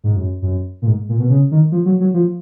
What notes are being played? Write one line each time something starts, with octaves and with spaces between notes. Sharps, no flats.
G#2
F#2
F#2
A#2
G#2
A#2
B2
C#3
D#3
F3
F#3
F#3
F3